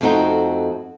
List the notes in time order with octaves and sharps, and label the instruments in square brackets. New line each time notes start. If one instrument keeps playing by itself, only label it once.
[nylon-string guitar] F2 A3 C4 D#4 F#4 G5